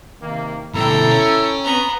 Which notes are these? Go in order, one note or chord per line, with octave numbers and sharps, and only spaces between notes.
C3 D#3 A#3
D2 B2 E4 A4 G5 A#5
C#4
B3 A#5